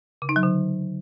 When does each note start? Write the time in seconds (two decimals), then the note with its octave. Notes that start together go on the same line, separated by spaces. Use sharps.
0.22 C#3
0.29 D#4
0.36 F#3
0.43 D3